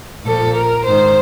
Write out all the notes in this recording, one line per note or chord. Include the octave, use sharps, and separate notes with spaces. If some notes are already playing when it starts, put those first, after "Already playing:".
A#2 F3 A4
A#4
G#2 D#3 C5